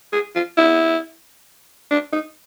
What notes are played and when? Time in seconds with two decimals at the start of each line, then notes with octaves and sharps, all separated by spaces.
0.12 G#4
0.35 F4
0.57 E4
1.91 D4
2.12 D#4